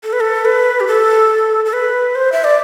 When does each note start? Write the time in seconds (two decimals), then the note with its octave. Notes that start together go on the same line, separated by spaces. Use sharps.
0.04 A4
0.13 B4
0.20 A4
0.45 B4
0.80 G4
0.87 A4
1.65 A4
1.73 B4
2.15 C5
2.32 E5
2.44 D5